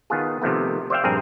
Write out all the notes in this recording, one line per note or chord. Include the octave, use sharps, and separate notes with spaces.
D#3 B3 F4 G#4
C3 D#3 F3 A3 B3
C5 D5 E5 F5 G5
A#1 G2 C4 G#4 A#4